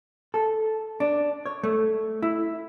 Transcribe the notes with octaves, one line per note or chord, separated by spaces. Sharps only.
A4
D4
C#5
A3
E4